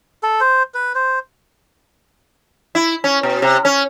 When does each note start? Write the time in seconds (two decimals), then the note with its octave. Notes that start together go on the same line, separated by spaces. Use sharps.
0.23 A4
0.41 C5
0.74 B4
0.95 C5
2.75 E4
3.04 C#4
3.23 B2
3.42 C3
3.65 C#4